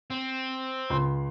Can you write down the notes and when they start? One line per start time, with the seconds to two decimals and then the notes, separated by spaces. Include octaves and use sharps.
0.11 C4
0.90 C#2 C6